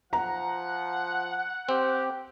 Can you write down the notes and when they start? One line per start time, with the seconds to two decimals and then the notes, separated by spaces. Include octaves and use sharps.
0.13 F3 F#5 A#5
1.69 C4 G4